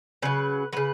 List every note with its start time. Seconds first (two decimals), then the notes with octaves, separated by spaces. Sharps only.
0.22 C#3 F#3 B4
0.73 C#3 F#3 B4